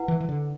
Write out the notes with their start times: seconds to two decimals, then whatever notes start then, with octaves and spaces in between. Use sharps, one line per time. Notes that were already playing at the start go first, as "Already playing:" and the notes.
Already playing: E4 B4 F#5
0.08 E3
0.20 E3
0.29 D3